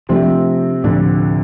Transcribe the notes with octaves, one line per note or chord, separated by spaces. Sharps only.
C3 F3 A3 C4 D4
D2 A2 D3 F3 D4